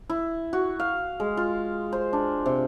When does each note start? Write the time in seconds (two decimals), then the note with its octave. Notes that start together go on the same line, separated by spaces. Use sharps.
0.10 E4
0.53 F#4
0.80 F5
1.20 G#3
1.37 F4
1.93 C5
2.13 D4
2.46 C3